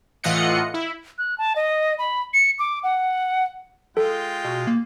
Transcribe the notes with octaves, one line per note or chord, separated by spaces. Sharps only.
A2 E3 F4 D#5 F#5 C#7
E4
F#6
A5
D#5
B5
C#7
D6
F#5
G#3 F4 A4 G5
B2
A#3